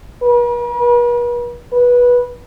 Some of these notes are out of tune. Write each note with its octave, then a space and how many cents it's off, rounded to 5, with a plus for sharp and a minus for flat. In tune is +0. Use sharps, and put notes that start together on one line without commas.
B4 -45
B4 -15